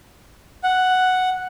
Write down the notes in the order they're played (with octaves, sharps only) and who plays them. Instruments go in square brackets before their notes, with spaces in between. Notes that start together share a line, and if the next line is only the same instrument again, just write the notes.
[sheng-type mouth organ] F#5